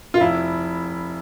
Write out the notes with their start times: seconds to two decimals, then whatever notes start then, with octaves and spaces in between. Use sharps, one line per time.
0.14 F4
0.20 F1 E4